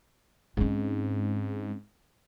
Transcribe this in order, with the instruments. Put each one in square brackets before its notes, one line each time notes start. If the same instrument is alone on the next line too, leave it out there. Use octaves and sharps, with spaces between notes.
[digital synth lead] G#2 [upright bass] C4 C#4